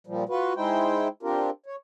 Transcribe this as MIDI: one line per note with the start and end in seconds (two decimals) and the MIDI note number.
0.07 0.24 46
0.07 0.24 53
0.07 0.24 55
0.29 0.53 65
0.29 0.53 66
0.29 0.53 71
0.56 1.08 56
0.56 1.08 63
0.56 1.08 64
0.56 1.08 72
0.56 1.08 79
1.23 1.50 60
1.23 1.50 62
1.23 1.50 65
1.23 1.50 67
1.23 1.50 70
1.66 1.76 73